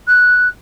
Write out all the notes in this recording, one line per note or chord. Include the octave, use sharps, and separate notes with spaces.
F#6